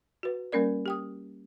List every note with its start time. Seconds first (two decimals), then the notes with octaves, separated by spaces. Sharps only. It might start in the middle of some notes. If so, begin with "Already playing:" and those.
0.23 F#4 B4
0.52 G3 A#3 C#4 A#4 D5
0.86 G4 G5 D#6